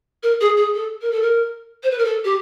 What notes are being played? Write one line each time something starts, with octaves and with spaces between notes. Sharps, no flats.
A#4
G#4
G#4
A4
A#4
A4
A#4
C5
B4
A#4
A4
G4